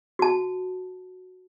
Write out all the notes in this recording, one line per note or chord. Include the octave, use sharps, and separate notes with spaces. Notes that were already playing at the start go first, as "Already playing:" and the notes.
F#4 A5